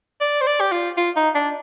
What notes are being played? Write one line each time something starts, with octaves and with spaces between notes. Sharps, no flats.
D5
C5
D5
G4
F4
F4
D#4
D4